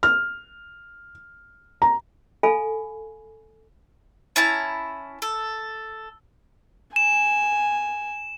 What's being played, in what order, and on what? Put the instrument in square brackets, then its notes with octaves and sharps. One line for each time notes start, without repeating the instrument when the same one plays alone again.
[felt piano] F6
A#5
[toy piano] A4 F5 G#5 B5
[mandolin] C#4 E4 A5 A#5
A4
[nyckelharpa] G#5 [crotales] E7